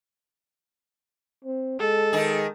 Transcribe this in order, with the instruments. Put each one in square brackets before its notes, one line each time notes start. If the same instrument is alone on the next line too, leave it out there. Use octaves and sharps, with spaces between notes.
[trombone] C4
[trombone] G#3 [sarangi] A4
[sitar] D#3 G#4